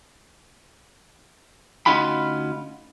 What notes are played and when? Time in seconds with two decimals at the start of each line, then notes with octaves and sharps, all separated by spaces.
1.86 D2 C#4 D#4 F4 F#4 B5